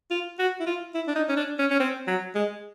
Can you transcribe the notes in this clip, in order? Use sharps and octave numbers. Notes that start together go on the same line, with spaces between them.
F4
F#4
E4
F4
E4
D4
D#4
C#4
D4
C#4
C#4
C4
F#3
G#3